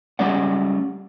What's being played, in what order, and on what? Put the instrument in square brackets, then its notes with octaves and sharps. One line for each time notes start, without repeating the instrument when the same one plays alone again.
[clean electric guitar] G3 G#3 C#4 D5 F#5